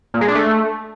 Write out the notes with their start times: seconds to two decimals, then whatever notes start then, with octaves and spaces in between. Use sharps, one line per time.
0.14 A#2
0.21 G#3
0.28 D4
0.35 A3